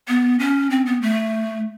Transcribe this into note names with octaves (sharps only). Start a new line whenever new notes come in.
B3
C#4
C4
B3
A3